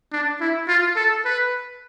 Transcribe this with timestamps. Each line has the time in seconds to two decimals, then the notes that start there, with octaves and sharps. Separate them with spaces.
0.12 D4
0.40 E4
0.68 F4
0.96 A4
1.25 B4